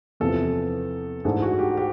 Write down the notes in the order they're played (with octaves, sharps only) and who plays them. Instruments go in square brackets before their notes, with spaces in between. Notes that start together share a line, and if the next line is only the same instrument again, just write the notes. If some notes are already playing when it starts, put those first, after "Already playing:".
[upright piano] E2 C3 F3 [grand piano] A4
[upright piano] G#2 E3 A3 D4 [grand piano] G#4
[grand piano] F#4
G4
G4